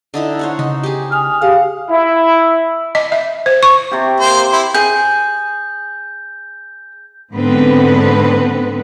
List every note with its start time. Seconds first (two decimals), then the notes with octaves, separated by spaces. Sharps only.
0.14 D3 D#4 E4
0.39 C5 C#5 F#5
0.59 C#3 D#4
0.83 G4 G#4
1.12 G#5 D#6 F6
1.42 G4 G#4 F5 F#5
1.91 E4
2.95 D#5
3.12 E5
3.46 C5
3.63 C#6
3.91 C3 G4
4.20 A#3 C5
4.52 E4 C5
4.75 G#4 G6
7.33 G#2 D3 B3 C4 B4